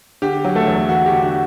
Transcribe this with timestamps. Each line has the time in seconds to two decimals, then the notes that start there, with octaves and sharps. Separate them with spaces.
0.22 D3 G4
0.44 F#3
0.55 A3 A4
0.67 E2
0.89 E2 F#4
1.06 G4
1.11 D3
1.22 F#4